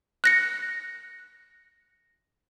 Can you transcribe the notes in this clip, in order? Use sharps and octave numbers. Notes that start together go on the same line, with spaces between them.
F#6 A#6 C#7